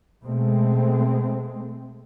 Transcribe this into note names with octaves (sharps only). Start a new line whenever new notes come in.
B2 G#3 A3 C4